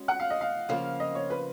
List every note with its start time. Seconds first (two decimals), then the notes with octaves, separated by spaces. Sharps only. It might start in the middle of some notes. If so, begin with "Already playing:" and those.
Already playing: G#3 C#4 F#4
0.08 F#5
0.20 F5
0.30 D#5
0.41 F5
0.69 C#3 F3 A#3 F5
1.00 D#5
1.15 C#5
1.30 B4